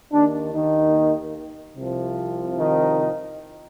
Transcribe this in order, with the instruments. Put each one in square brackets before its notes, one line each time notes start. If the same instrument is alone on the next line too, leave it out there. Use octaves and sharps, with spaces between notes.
[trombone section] D#2 D#3 A#3 D4
D#3 D#4
C2 C3 F3
D#3 D#4